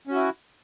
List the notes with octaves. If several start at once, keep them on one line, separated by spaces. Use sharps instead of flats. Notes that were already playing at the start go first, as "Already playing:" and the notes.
C#4 E4 F#4